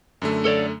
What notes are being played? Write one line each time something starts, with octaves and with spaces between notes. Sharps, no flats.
F#2 D3 A3
A4 C#5 D5